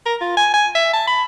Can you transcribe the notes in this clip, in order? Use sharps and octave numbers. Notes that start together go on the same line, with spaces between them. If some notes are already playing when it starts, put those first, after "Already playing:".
A#4
F4
G#5
G#5
E5
A5
B5